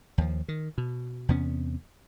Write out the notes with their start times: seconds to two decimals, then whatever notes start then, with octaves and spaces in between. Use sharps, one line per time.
0.18 D#2 F3
0.48 D#3
0.78 B2
1.29 E2 C3 B3 C#4